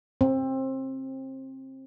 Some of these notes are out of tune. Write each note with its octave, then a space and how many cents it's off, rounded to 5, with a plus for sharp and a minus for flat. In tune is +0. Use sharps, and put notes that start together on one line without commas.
C4 +25